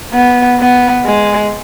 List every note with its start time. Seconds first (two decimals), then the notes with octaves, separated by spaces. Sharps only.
0.14 B3
0.59 B3
1.05 G#3